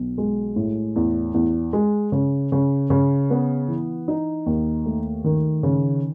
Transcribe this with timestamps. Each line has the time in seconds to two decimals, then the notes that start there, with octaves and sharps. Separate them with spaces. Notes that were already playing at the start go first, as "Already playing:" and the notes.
Already playing: B1
0.18 G#3
0.56 A2
0.96 E2
1.34 E2
1.73 G#3
2.12 C#3
2.52 C#3
2.90 C#3
3.30 B3
3.68 E3
4.08 D#4
4.46 D#2
4.86 A3
5.24 D#3
5.63 C#3